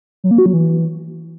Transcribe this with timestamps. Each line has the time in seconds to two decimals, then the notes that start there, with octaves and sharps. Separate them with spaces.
0.24 F#3
0.31 A#3
0.38 F#4
0.46 F#3
0.53 E3